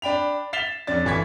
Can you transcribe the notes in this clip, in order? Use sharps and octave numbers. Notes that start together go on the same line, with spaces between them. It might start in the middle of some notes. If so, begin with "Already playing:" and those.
D4 G5 B5 F7
A6 B6 C7 E7 F7 G7
F2 C#4 D4 A6
G1 E3 C#6 G#6 B6